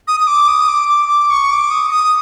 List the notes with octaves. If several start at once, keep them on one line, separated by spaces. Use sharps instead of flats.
D#6
D#6
D6
D#6
D6
D6
D6
C#6
D6
D#6
D#6